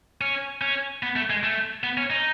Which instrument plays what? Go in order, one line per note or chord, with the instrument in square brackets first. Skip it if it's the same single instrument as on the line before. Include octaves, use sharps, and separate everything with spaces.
[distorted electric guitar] C#4
C#4
B3
A3
G#3
A3
B3
C#4
D#4